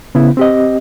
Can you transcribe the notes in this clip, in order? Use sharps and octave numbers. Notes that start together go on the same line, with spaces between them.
C#3 B3 E4
C4 G4 D#5